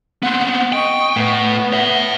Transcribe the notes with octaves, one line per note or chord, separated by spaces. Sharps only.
B3 C4 F#5
D#5 G5 C#6
A2 B3
C#5 E5